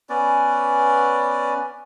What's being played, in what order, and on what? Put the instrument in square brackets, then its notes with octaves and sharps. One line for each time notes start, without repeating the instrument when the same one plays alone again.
[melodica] B3 C#4 D5